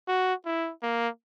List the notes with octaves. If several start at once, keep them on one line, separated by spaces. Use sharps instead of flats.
F#4
E4
A#3